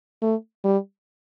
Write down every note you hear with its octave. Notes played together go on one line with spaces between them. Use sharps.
A3
G3